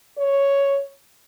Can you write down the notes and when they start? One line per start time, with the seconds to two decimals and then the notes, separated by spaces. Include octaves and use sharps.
0.18 C#5